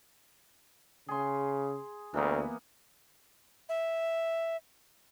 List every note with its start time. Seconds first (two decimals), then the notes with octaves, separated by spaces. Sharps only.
1.08 C#3 G#4 C6
2.14 D2 E3 A#3 B3
3.69 E5